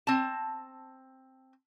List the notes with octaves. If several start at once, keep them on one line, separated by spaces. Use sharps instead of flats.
C4 A5